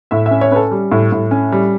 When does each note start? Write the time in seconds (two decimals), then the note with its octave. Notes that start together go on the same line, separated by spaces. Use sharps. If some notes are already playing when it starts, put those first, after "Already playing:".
0.11 A2 E5
0.26 E5
0.31 C#4
0.41 C#5
0.51 C#4 B4
0.56 A4
0.71 G3
0.92 A2
1.12 A2
1.31 C#4
1.52 G3